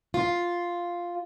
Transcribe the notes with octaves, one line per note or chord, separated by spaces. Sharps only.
F4